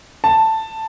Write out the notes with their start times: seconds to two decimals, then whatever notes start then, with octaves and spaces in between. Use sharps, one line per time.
0.24 A5